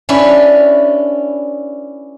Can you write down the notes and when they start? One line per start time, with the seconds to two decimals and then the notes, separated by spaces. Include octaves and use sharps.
0.09 C#4 D4 E4 G4 B4